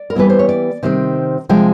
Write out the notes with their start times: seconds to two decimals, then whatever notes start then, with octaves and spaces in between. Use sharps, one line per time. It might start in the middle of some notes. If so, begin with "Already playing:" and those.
Already playing: D5
0.10 A#4
0.15 E3 G3 B3 E4 B4
0.30 C5
0.39 C#5
0.49 D5
0.83 C3 D#3 G3 C4
1.49 C3 F3 G#3 G5